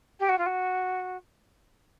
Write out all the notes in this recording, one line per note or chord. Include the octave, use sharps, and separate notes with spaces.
G4
F#4
F4
F#4